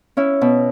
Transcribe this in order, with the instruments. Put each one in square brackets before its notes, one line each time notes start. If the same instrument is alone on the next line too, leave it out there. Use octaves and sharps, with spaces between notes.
[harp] C#4 E4
B2